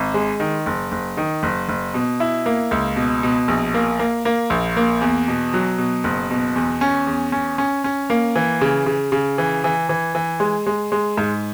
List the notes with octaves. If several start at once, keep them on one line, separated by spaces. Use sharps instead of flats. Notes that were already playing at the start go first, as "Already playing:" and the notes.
Already playing: G#1
G#3
D#3
F#1
F#1
D#3
F#1
F#1
B2
E4
A#3
C#2
B2
B2
A#1
A#3
A#3
A#3
A#1
A#3
E2
B2
F#3
B2
F#1
B2
E2
C#4
E2
C#4
C#4
C#4
A#3
E3
C#3
C#3
C#3
E3
E3
E3
E3
G#3
G#3
G#3
G#2